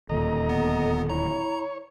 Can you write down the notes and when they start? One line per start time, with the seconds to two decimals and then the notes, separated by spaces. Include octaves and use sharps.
0.09 D1 D#2 A#2 A4 D#5 A#5
0.49 B3
1.10 E4 C#5 A#5